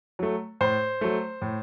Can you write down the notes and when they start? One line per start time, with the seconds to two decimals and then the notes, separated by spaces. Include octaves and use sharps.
0.19 F#3 A3
0.61 A2 C5
1.01 F#3 A3
1.42 A2